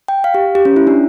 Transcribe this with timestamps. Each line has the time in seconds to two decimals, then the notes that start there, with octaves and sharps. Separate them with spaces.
0.08 G5
0.24 F5
0.34 G4
0.55 G4
0.65 C#4
0.76 E4
0.87 D4